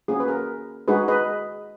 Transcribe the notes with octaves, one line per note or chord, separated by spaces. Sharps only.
A#3 C#4 F#4 G#4
B4
A#4
G#3 D#4 F#4 G#4 B4
B4 D#5